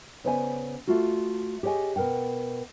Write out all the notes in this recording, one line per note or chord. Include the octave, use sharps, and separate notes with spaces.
C#3 B3 C5 D5 D#5 G#5
A3 F4 F#4
G4 G#4 C#5 D#5 G#5
B2 A#4 F#5 G5